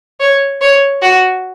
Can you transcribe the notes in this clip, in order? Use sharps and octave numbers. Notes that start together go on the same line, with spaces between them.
C#5
C#5
F#4